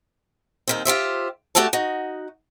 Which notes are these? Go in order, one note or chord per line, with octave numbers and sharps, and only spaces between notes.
D#2 D#3 C4
F4 G4 C5 E5
D2 A3 F#4 G4 E5 A5
D#4 F#4